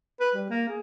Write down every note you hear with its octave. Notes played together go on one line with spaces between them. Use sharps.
B4
G3
A#3
G#4